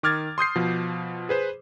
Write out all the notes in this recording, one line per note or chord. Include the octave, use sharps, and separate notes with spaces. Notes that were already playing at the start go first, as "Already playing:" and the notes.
D#3 D6 F6 G#6 A6
C6 D#6 G6 C7
B2 F3
G#4 B4 C5